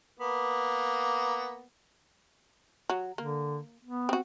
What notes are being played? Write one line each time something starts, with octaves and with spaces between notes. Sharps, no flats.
A#3 B3
F#3
D3 A#3
B3
C4 F#4